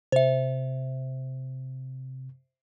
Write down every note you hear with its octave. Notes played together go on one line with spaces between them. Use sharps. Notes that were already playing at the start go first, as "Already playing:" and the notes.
C3 C5 E5